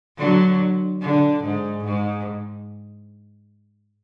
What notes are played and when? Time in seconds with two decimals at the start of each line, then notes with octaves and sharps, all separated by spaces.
0.17 D3 F#3
1.01 D3
1.44 G#2
1.85 G#2